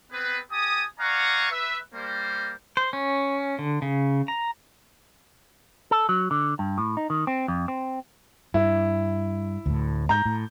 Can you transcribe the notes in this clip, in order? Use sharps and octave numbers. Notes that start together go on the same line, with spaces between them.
B3 C4 G#4 B4
G4 G#5 A5 D#6
D5 F5 F#5 G#5 A#5 C#6
B4 E5
G3 A#3 C5
C5
C#4
D3
C#3
A#5
A4
F#3
D3
G2
A2
D#4
D#3
C4
F2
C4
G2 E4
D2 A2
G#2 A#5 G6
A2